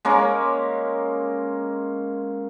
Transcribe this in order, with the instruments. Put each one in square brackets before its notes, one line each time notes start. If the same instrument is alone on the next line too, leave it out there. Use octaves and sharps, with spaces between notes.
[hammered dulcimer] G#3 A#3 C#4 A#4